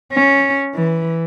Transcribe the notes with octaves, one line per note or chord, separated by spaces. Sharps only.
C#4
E3